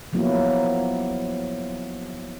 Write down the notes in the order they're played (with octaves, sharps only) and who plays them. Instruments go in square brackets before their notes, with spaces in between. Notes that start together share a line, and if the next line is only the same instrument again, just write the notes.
[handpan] F3 F#3 A#3 B3 E4